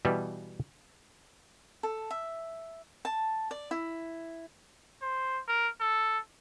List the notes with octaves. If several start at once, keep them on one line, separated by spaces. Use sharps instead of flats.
B2 E3 G3
A4
E5
A5
D5
E4
C5
A#4
A4